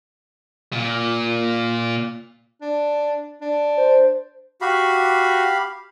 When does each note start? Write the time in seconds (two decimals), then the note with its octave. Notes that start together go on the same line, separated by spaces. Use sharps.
0.73 A#2
2.62 D4
3.41 D4
3.77 C5
4.61 F#4 G4 F5 B5